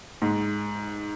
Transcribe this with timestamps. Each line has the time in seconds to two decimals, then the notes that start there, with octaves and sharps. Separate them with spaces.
0.22 G#2